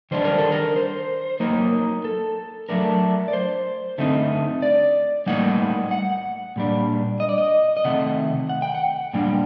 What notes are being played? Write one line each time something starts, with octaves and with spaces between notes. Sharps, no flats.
D#3 G3 D4 C5
A#4
A4
A#4
C5
F#3 A#3 D#4 A#4
A4
F#3 A3 D4 A#4
D5
C5
D3 A3 C4 D#4
D5
A2 G3 A#3 D#4 F#5
F#5
A#2 G3 D4
D#5
D5
D#5
D#5
C3 D#3 A3 F#5
F#5
G5
F#5
A#2 G3 D4 G5